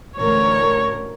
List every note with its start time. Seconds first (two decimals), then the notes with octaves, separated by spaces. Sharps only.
0.18 A1 D2 A#4 C#5